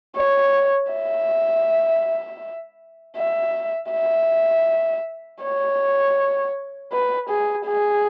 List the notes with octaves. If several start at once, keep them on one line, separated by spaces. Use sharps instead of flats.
C#5
E5
E5
E5
C#5
B4
G#4
G#4